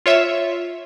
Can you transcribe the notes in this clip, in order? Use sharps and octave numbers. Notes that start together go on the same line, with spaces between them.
F4 C#5 E5